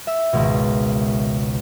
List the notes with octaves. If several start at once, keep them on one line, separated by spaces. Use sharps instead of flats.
E5
G#1 C#2 B2